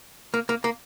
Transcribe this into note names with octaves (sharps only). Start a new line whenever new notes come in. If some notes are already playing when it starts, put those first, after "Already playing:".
A#3
A#3
A#3